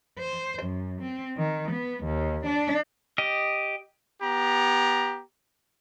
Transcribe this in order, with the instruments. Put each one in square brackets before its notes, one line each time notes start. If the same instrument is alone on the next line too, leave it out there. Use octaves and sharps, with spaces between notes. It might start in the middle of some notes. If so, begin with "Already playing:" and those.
[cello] C5
F#2
C4
D#3
B3
D#2
D4
[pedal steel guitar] G4 D#5
[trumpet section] B3 G4 A#5